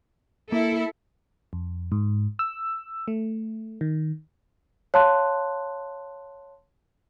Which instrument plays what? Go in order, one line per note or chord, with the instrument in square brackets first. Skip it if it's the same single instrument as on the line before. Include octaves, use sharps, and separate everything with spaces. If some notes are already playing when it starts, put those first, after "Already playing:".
[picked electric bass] A#3 [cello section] E4 A4
[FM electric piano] F2
G#2
E6
A3
D#3
[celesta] C#5 F5 A5 C6 F#6